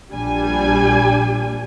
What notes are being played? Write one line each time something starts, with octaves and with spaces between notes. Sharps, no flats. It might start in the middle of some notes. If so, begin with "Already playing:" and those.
A#1 G3 D4 G#5